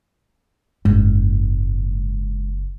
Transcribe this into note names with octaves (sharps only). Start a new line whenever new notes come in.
F#1 G#2